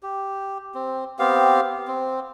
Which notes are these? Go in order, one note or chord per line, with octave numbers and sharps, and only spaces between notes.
G4
C4
B3 C4 G4 F5
C4